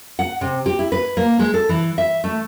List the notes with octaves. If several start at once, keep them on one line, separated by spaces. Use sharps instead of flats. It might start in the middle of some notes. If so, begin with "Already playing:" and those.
F#5
C3
G4
E4
B4
A#3
G#3
A4
E3
E5
A3